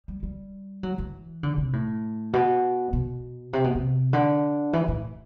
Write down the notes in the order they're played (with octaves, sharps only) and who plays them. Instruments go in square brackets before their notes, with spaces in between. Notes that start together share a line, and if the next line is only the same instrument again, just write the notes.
[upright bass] G3
G3
F#3
E3
D3
C3
A2
B2
B2
C3
B2
C3
D3
E3
A2